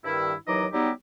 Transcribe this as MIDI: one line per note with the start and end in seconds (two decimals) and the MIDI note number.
0.04 0.34 43
0.04 0.34 51
0.04 0.34 64
0.48 0.66 39
0.48 0.66 52
0.48 0.66 54
0.48 0.66 63
0.48 0.66 75
0.48 0.66 86
0.73 0.90 54
0.73 0.90 55
0.73 0.90 59
0.73 0.90 63
0.73 0.90 64
0.73 0.90 67